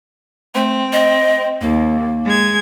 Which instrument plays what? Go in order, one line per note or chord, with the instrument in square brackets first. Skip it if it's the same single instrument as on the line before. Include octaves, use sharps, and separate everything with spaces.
[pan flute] A3 [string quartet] C4
[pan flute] D#5
[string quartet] D#2 [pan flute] A#3
[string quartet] G#3 G#6